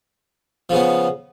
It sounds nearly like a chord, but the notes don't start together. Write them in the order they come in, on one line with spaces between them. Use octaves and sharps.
F3 C#3 B3